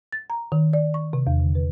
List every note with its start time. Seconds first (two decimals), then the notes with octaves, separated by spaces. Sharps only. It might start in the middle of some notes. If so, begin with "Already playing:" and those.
0.12 A6
0.30 A#5
0.52 D#3
0.73 D5
0.94 C#6
1.13 C3
1.27 E2
1.40 D3
1.55 B4